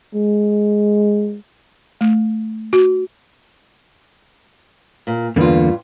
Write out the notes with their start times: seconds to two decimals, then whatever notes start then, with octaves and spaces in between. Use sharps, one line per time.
0.14 G#3
2.01 A3
2.73 F#4
5.07 A#2
5.36 E2 G2 D3 A#3 F4